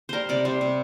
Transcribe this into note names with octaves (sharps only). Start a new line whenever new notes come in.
G3 A#4 C5
C3 D5
G3 C5
C3